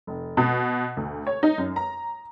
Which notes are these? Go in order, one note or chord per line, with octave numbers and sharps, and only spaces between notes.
F1
B2
D2
C#5
D#4
F#2
A#5